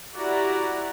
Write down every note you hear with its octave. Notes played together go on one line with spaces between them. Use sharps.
E4 F#4 G4 D5 F#5 A#5